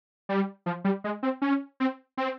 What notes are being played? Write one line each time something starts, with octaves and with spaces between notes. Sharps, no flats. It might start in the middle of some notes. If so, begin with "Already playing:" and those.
G3
F3
G3
G#3
C4
C#4
C4
C4